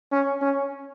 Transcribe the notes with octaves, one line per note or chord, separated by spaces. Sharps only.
C#4
C#4